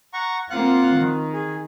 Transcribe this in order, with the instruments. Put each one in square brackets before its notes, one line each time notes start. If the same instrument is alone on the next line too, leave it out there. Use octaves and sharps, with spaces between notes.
[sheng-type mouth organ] F#5 A#5 C#6
[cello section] A#3 C4 F4 [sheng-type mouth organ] F5 F#5 F#6
[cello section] D#3
[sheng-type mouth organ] G#4